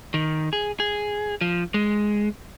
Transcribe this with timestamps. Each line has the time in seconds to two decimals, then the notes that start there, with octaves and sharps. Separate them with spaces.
0.14 D#3
0.53 G#4
0.80 G#4
1.41 F3
1.74 G#3